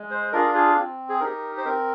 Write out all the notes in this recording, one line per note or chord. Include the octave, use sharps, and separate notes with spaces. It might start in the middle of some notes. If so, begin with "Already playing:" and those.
Already playing: G#3
C5
D4 F4 G#4 A#4
G#4
C4
G#4
D#4 G4 A#4
C5
C4 A#4